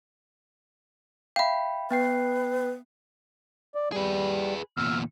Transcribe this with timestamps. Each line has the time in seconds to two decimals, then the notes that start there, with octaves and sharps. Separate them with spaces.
1.36 E5 F5 G5 B5
1.91 B3 B4 G5 C7
3.75 D5
3.92 G3 G#4 B4
4.77 E2 A#2 E6 F6